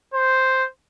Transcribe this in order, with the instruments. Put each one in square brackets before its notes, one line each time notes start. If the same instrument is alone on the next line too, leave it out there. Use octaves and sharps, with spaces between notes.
[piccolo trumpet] C5